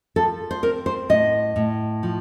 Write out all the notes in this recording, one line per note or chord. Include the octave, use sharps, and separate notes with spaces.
F3 A4
C5
C4 A#4
C5
A2 D#5
A2
F3